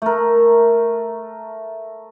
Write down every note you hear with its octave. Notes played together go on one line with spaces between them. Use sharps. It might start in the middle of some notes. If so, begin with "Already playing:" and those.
A3 A#4